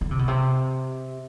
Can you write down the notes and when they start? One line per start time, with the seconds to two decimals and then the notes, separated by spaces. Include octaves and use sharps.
0.01 D3
0.11 C3
0.19 B2
0.28 C3